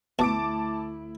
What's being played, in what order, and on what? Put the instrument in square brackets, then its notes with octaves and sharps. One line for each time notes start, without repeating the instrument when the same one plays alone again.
[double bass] D2 E4 [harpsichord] B2 [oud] A3 E5 [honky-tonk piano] A5 D6 D7